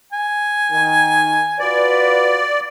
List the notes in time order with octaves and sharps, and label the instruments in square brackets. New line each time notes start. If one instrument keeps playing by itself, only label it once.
[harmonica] G#5
[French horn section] D#3
[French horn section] F4 F#4 B4 [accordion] D5